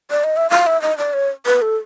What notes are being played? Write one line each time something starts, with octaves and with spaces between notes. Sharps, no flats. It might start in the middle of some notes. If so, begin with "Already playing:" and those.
D5
D#5
E5
F5
E5
D#5
D5
C#5
B4
A4